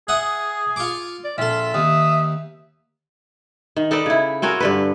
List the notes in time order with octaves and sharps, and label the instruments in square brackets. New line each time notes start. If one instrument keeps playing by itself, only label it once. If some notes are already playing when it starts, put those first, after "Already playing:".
[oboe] G#4 [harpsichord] E5 F#5 D#6
[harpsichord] F4 C#6 D6
[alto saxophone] D5
[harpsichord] A#1 A4 [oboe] F4 [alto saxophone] E5
[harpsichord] D#2 [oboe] D#6
[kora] D#3
D#4 A4 B4 D5
C#3 E4
C4 C#4 F#4 A#4
G2 D3 B4